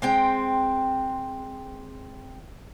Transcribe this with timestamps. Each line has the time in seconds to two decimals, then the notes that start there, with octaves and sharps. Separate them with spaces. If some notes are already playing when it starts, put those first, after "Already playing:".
0.02 G#3 C4 G5